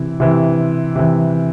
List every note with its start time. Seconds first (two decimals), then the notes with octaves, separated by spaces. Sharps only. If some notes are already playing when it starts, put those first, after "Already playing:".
Already playing: C3 E3
0.20 C3 E3
0.96 C3 E3